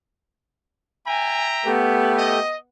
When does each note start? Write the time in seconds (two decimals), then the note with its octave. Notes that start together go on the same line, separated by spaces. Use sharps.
1.07 E5 G5 G#5 A#5
1.65 A3 B3 G4
2.18 D#5